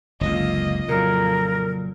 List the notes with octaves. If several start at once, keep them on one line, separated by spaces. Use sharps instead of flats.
F#1 C#2 D3 A#3 F4 D#5
F2 A#2 C#3 F#3 A#4